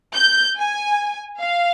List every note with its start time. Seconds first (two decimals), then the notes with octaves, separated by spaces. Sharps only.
0.15 G6
0.57 G#5
1.40 F5